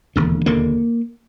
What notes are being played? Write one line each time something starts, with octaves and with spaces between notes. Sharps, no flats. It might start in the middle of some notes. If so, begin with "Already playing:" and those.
E1 D#2 D3
E1 D#2 D3 A#3